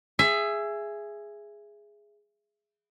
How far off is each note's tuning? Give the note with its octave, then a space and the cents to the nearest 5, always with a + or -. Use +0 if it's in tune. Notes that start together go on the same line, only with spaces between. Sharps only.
G#4 +0 E5 +20